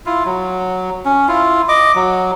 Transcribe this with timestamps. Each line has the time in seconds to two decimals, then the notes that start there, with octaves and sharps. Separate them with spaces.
0.06 E4 F4
0.25 F#3
1.05 C#4
1.28 E4 F4
1.69 D#5 D6
1.95 F#3